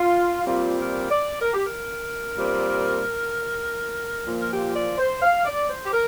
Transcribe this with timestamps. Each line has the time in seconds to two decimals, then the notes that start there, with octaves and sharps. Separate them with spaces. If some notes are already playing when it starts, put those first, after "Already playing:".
Already playing: F4
0.46 A#2 G3 C4 F4
0.78 A#4
1.10 D5
1.41 A#4
1.53 G4
1.65 A#4
2.36 A#2 G3 C4
4.26 A#2 F3 A#3
4.39 A#4
4.49 G4
4.74 D5
4.97 C5
5.21 F5
5.45 D5
5.69 C5
5.84 G4
5.92 A#4